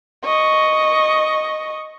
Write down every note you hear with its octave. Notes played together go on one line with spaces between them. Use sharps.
D#5 C#6